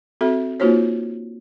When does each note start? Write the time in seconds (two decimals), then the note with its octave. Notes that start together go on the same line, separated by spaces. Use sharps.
0.21 C4 F#4 A4 E5
0.60 A#3 D#4 F4 F#4 C5 C#5